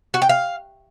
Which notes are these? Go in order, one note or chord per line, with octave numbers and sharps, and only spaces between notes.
F#4
G5
F5